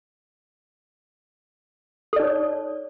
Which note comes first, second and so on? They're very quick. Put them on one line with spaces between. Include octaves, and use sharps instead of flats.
A4 D5 D#4 C#5